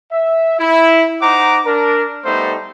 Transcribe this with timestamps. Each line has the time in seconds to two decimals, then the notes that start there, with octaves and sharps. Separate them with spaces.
0.12 E5
0.59 E4
1.22 D#4 C5 F#5 A#5 D6
1.66 D4 A#4
2.25 G3 A3 B3 D#4 A4 C5